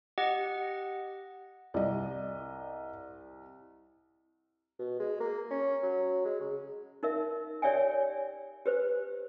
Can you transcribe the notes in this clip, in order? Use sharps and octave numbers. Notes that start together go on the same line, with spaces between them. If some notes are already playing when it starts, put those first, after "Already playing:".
G4 D#5 F#5
C2 D5 D#5
B2
G#3
A#3
C#4
F#3
G#3
C#3
D#4 A#4 E5
G4 C#5 D5 E5 G5 G#5
G4 B4 C5